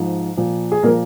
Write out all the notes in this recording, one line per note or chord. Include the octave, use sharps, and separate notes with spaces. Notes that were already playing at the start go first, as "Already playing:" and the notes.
Already playing: G#2 F3
A#2 F3
G#4
A#2 F3 A#3 A#4